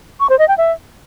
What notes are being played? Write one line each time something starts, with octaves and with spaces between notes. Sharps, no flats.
C#6
C5
D#5
G5
E5